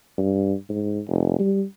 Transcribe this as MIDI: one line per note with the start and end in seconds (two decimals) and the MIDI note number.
0.18 0.54 43
0.69 1.00 44
1.08 1.36 29
1.39 1.63 55